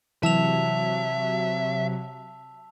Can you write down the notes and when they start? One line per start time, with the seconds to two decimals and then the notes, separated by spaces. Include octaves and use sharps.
0.23 C3 E3 F#3 E5 A5 E6 F7